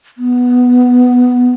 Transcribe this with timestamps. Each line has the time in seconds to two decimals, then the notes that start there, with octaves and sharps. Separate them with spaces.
0.18 B3